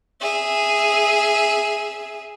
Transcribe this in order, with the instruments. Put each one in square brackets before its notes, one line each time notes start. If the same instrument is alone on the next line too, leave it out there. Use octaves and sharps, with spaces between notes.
[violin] G#4 E5